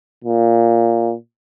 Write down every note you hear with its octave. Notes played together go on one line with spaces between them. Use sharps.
A#2